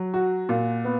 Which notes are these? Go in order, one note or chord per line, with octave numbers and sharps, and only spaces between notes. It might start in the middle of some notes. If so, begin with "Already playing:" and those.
Already playing: F#3
F#4
A#2
B3